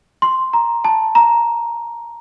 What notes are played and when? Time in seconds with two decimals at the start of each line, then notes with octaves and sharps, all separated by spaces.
0.22 C6
0.53 A#5
0.84 A5
1.15 A#5